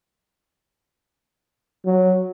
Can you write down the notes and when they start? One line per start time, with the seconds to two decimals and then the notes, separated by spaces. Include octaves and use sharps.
1.86 F#3